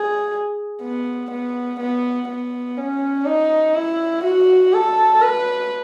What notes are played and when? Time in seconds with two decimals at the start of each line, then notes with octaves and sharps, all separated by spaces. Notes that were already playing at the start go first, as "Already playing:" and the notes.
Already playing: G#4
0.82 B3
1.31 B3
1.80 B3
2.28 B3
2.78 C#4
3.26 D#4
3.75 E4
4.25 F#4
4.73 A4
5.22 B4